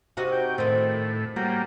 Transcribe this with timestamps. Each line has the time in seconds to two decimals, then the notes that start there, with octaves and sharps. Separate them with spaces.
0.17 C3 D#4 F#4
0.32 G5
0.58 A2 D#3 C4
1.36 F#3 G3 A#3